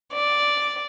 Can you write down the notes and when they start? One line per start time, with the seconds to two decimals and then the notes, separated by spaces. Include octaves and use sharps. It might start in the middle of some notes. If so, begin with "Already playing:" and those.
0.13 D5